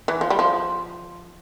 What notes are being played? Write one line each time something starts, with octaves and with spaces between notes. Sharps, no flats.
E3
F3
G3
F3